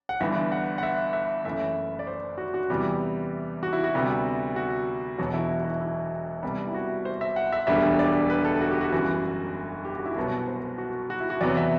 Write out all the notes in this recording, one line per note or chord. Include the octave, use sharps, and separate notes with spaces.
F#5
G1 G2 E3 B3 E5
F#5
F#5
E5
E5
F#1 F#2 E3 A3 E5
D5
C5
F#4
F#4
E2 C3 E3 G3 B3 G4
F#4
E4
F#4
D2 C3 G3 B3
F#4
E1 E2 B2 F#3 F#4
E4
F#4
F#4
E4
E4
C2 C3 G3 B3
E4
F#4
C5
E5
F#5
E5
E1 D2 D3 G3 B3 E5
D5
B4
A4
F#4
G4
F#4
G1 F#2 E3 F#4
G4
F#4
E4
C2 B2 F#3 B3 F#4
C5
F#4
F#4
E4
F#4
E2 C3 F#3 B3 D5
E5